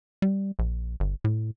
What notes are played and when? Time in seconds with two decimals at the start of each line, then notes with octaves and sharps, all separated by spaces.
0.22 G3
0.59 A#1
1.00 G1
1.24 A2